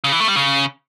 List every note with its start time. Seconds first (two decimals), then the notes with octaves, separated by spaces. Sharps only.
0.04 C#3
0.12 E3
0.20 A3
0.28 G3
0.36 C#3